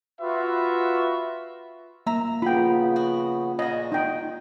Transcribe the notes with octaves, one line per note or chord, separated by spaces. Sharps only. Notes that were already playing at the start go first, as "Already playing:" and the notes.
F4 F#4 B4 E5
A#3 E5 A#5
C#3 B3 F4 G5 B5
F#4
A#2 C#3 F#4 D#5
D#4 G5